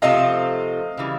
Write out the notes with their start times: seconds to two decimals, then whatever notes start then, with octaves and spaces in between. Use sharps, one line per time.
0.02 C3 F3 A3 C4 F4 D#5 F5
0.97 C#3 E3 G3